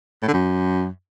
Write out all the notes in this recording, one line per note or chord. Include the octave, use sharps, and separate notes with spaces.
A2
D3
F#2